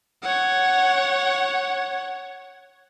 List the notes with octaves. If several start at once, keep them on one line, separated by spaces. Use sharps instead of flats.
C#5 F#5